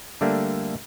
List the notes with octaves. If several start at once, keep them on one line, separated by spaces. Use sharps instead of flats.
D3 G3 A3 A#3 D4